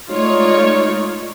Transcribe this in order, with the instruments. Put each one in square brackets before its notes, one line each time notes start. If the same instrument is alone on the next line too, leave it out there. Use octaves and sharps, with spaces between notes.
[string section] G#3 A3 D#4 F4 C#5 D5